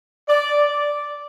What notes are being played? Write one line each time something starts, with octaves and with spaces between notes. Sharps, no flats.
D5